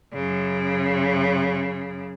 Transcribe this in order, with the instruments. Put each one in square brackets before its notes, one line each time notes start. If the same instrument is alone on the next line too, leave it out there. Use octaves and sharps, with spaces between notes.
[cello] F#2 C#3